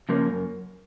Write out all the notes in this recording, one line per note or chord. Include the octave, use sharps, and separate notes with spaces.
C#3 F3 A#3 C#4
F#2